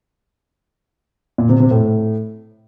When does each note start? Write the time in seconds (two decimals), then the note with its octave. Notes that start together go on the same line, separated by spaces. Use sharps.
1.38 A#2
1.49 C3
1.60 C3
1.71 A2